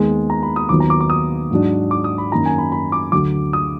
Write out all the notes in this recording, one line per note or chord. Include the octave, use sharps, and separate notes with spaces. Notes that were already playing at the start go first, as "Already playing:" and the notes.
Already playing: D#2 D#3 G#3 B3
A#5
B5
D#6
D#2 D#3 F#3 B3 F4 D6
A#5
D6
D6
D#6
G#2 F#3 D4
D6
D#6
B5
F#2 D#3 A#3 D#4 A#5
G#5
B5
B5
D6
D2 D3 F#3 D6
D#6